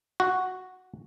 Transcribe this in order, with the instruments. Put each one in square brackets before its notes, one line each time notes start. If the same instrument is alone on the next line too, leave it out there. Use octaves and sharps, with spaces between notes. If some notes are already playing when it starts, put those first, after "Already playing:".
[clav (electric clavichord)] F#4